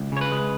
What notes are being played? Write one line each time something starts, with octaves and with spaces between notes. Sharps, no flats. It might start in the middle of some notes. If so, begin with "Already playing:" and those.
Already playing: C#2
C#3 C#5
B4
G#3